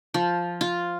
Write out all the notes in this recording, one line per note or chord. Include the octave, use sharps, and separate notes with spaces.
F3
F4